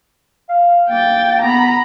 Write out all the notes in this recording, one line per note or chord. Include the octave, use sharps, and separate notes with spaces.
F5
A#3 G5 A6
B3 A#5 B5